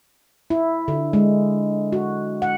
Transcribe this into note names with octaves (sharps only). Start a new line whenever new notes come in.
E4
D3
G#3
F#4
F#5